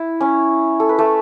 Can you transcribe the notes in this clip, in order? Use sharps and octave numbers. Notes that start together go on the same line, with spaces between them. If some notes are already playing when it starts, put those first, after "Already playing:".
Already playing: E4
C#4
A4
B4
A3 A4